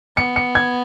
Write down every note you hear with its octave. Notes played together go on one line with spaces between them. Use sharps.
B3 C#7
C#7
G#6